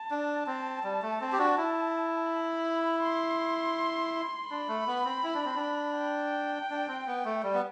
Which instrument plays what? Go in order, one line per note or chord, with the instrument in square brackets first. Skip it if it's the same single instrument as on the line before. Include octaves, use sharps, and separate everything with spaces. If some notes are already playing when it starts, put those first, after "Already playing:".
Already playing: [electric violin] A5
[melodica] D4
C4
G3
A3
C4
G4
D4 F#4
E4
[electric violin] B5
C6
[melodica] D4 [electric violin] B5
[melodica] A3
B3
C4
E4
D4
C4
D4
[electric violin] G5
[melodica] D4
C4
B3
A3
G3
B3